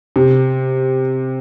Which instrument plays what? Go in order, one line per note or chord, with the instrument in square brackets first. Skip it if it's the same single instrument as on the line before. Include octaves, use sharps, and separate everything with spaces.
[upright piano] C3